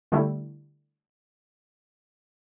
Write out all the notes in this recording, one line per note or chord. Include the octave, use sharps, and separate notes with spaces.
D3 G3 A3 E4